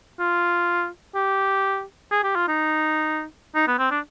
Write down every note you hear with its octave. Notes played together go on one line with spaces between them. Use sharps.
F4
G4
G#4
G4
F4
D#4
D#4
B3
C4
D4